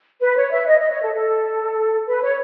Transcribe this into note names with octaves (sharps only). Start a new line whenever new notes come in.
B4
C#5
E5
D#5
D#5
C#5
A4
A4
B4
C#5